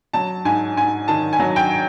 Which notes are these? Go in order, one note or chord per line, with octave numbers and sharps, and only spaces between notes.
F#3 A5
G#2 G#5
G#2 G#5
D#3 A5
G#5
F#3
G5